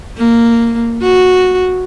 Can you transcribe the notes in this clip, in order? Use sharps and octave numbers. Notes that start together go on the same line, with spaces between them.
A#3
F#4